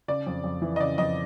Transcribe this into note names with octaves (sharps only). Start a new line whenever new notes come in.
C#3 D5
F2
F2
E3
D#5
C#3 D5
F2 D#5